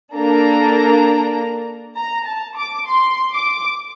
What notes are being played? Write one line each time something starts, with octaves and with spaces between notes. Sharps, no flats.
A#3 D4 A4 A#5
A#5
A5
D6
C6
D6